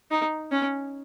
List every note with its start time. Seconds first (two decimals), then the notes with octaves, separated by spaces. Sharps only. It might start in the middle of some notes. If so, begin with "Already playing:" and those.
0.11 D#4
0.52 C#4